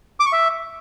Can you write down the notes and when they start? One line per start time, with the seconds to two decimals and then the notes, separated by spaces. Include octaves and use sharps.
0.20 D6
0.26 C#6
0.33 E5